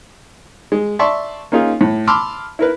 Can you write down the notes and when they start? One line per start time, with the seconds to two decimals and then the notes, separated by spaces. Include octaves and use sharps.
0.72 G#3
0.99 D5 E5 A5 C6 C#6
1.52 A#3 C#4 D#4 F4 G#4
1.81 A2
2.07 A5 B5 C6 D6 E6 F6
2.59 E4 A#4 B4